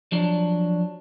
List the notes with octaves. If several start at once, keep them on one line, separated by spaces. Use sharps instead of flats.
F3 F#3 D4